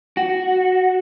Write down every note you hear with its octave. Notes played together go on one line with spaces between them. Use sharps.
F#4